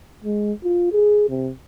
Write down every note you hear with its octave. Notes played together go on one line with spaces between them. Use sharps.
G#3
F4
G#4
C3